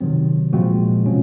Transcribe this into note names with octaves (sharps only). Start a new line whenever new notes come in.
C3 D#3 F#3 C4
A#2 F3 G#3 C4 F#4
C3 F#3 C#4 F4